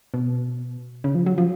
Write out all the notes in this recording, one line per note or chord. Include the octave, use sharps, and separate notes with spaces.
B2
C#3
F3
F#3
F3